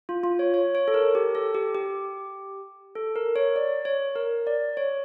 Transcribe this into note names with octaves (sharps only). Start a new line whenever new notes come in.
F4
F4
C#5
C#5
C#5
A4
A#4
G4
A4
G4
G4
A4
A#4
C#5
D5
C#5
A#4
D5
C#5